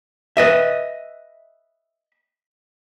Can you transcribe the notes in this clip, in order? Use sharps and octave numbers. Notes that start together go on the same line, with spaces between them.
B4 D#5 E5